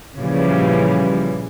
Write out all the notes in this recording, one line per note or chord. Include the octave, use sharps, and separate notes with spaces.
A#2 C#3 E3 F3 G3